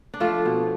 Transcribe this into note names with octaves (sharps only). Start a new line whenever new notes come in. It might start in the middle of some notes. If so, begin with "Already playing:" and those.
D4
F3 A3 F4
B2